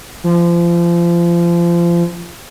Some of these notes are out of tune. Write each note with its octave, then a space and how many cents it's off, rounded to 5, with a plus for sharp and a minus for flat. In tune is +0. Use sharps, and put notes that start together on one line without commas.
F3 -30